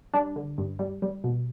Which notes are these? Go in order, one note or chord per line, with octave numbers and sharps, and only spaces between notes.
G3 D4
D3
G2
G3
G3
B2